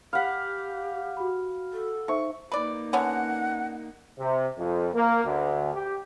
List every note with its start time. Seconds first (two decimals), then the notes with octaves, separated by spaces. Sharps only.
0.13 G4 F5 F#5 B5 B6
1.17 F#4 B5
1.73 A4
2.08 D#4 C5 E5 C#6
2.52 A#3 D#4 B4 D5
2.93 D3 B3 C#4 F#5
4.19 C3
4.58 F2
4.93 A#3
5.25 D2
5.74 G4